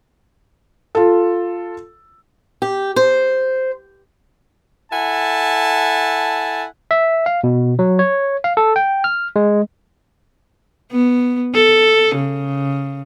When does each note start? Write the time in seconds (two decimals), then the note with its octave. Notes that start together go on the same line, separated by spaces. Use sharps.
0.95 F4 A4
2.62 G4
2.96 C5
4.92 E4 A4 F#5 G#5 A5
6.91 E5
7.26 F5
7.44 B2
7.79 F#3
7.99 C#5
8.44 F5
8.57 A4
8.76 G5
9.04 F6
9.36 G#3
10.92 B3
11.55 A4
12.16 C#3